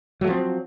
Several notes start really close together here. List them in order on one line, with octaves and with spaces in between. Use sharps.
F#3 A3 F3 C4